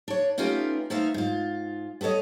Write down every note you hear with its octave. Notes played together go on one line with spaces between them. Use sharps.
D4 C#5
A3 B3 C#4 D#4 F4 G4
A3 B3 D#4 C5 E5 F5
G#2 F4
B3 A4 C5 C#5 D#5